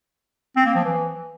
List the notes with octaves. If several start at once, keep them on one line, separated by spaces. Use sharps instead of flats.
C4
A#3
F3
E3